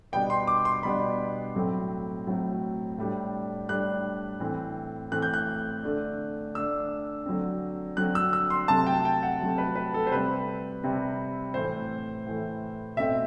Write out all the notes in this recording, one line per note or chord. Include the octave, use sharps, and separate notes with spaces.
B2 G3 B3 D4 G5
C6
D6
C6
B2 G3 B3 D4 B5
A2 F#3 A3 C4
A2 F#3 A3 C4
A2 G3 D4
A2 G3 D4 F#6
A2 E3 A3 C4
A2 E3 A3 C4 F#6
G6
F#6
D3 A3 D4
D3 A3 D4 E6
D3 F#3 C4
D3 F#3 C4 F#6
E6
E6
C6
C3 F#3 A3 C4 A5
G5
G5
F#5
C3 F#3 A3 C4
B4
B4
A4
C5
C3 G3 C4 B4
C3 G3 C4
A2 E3 A3 C5
A2 E3 A3
B2 A3 C4 E5